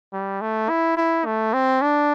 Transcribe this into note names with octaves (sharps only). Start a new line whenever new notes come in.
G3
A3
E4
E4
A3
C4
D4